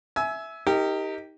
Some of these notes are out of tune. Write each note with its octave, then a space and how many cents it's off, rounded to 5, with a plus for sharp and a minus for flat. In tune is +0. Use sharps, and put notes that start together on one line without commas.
E5 +0 G#5 +25 E6 -10
D#4 +20 G4 +5 A#4 -25